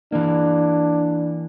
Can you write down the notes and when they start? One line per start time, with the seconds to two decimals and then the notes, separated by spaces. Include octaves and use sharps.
0.12 E3 A#3 D4